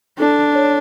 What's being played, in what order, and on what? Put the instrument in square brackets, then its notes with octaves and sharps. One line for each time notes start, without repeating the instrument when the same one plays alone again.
[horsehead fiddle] D4 [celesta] A4
[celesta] C#5